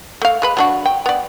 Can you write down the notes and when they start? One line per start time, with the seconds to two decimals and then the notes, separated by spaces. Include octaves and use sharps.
0.22 A3 F5
0.42 G#3 B4 B5
0.57 F#3 D4 F#4
0.86 G5
1.06 B3 D5